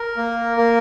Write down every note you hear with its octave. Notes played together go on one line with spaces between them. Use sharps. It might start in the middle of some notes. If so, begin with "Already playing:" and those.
Already playing: A#4
A#3
A#3